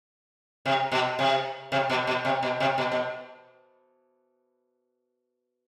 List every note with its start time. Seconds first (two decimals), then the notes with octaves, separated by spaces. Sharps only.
0.66 C3
0.92 B2
1.19 C3
1.72 C3
1.90 B2
2.07 B2
2.25 C3
2.43 B2
2.60 C3
2.78 B2
2.92 B2